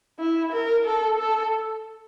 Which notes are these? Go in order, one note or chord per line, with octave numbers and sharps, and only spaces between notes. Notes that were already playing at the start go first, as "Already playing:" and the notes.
E4
A#4
A4
A4